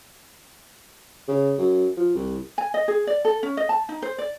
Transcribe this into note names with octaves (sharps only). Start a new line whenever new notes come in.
C#3
F#2
F3
C2
G#5
D#5
G#4
D5
A4
C#4
D#5
A5
D#4
C5
D5